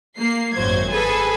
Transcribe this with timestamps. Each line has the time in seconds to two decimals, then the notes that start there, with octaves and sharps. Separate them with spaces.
0.18 A#3 C7
0.54 G#1 F#2 F#3 C5 G#6
0.90 G#4 A4 B4 G#5